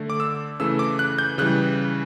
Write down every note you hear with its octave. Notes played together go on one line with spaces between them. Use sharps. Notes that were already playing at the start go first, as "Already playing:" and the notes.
Already playing: D3 A3
D6
E6
C#3 E3 A3 E6
D6
F#6
G6
C#3 E3 G3 F#6